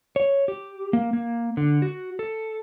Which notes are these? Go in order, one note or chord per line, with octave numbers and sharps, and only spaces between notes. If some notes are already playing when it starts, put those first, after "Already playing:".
C#5
G4
A#3
A#3
D3
F#4
A4